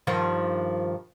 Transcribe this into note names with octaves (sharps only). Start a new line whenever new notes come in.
G2 D#3 F3